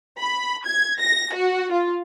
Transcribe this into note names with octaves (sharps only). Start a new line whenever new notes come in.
B5
G#6
A#6
F#4
F4